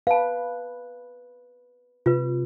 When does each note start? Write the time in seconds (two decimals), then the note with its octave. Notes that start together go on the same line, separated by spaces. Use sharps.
0.07 B4 F5 A5
2.06 C3 F4 B4